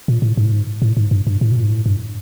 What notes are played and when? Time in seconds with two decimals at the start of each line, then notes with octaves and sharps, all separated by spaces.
0.08 A#2
0.22 A2
0.37 G#2
0.45 A2
0.52 G#2
0.82 A2
0.97 G#2
1.11 G2
1.27 G2
1.41 A2
1.52 B2
1.56 A#2
1.63 G#2
1.71 A2
1.86 G2